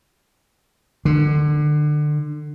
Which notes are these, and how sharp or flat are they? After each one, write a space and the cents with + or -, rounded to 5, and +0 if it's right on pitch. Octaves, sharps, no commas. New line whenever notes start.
D3 +25